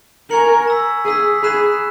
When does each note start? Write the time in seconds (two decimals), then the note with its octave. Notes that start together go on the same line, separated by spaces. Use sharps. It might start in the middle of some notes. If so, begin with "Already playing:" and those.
0.30 A#4 G#5 C#6 G#6 C#7 F#7
0.67 A#5 E6 B6
1.05 G#4 A#5 E6 B6
1.43 G#4 B5 F#6 B6 E7